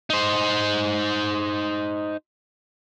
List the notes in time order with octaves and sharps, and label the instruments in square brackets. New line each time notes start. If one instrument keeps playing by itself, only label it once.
[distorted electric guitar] D#4 C5